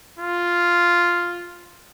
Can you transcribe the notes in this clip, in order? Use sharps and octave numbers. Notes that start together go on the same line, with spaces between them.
F4